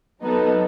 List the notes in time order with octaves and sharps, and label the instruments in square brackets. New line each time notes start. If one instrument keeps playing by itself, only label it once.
[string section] F#3 B3 D#4 A4